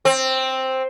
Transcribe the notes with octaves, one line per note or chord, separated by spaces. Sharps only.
C4